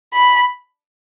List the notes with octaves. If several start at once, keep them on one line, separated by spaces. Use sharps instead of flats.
B5